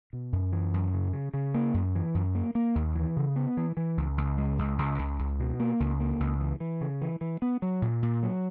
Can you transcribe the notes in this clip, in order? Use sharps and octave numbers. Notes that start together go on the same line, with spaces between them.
B2
F#2
E3
F#2
C#3
C#3
C#3
A#3
F#2
E3
F#2
A#3
A#3
D#2
E3
C#3
B3
E3
E3
C#2
C#2
G#3
C#2
C#2
C#2
C#2
B2
A#3
C#2
A#3
C#2
E3
E3
C#3
E3
E3
B3
F#3
A#2
A#2
F#3